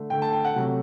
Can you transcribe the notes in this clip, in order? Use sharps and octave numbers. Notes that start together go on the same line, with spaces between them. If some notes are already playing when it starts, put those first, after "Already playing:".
Already playing: D3 A3
D3 A3 G5
A5
G5
F#5
C3 F#3 A3